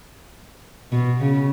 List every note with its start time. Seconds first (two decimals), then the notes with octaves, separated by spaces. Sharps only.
0.92 B2
1.20 C#3